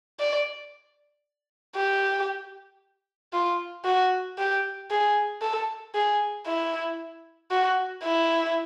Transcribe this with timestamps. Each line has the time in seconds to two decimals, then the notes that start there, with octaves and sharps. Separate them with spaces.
0.20 D5
1.76 G4
3.33 F4
3.85 F#4
4.38 G4
4.90 G#4
5.42 A4
5.95 G#4
6.46 E4
7.51 F#4
8.04 E4